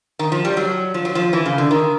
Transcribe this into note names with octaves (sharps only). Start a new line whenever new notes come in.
D#3
F3
G3
F#3
F3
F#3
F3
E3
C#3
D3
D#3